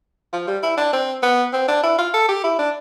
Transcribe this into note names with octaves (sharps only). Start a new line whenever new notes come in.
F3
G3
E4
D4
C4
B3
C4
D4
E4
F4
A4
G4
E4
D4